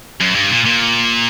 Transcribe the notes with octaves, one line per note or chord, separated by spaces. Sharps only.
F#2
G2
A#2
A#2